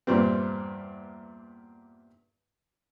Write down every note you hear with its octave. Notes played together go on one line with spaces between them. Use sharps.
E2 G2 A#2 G3 C4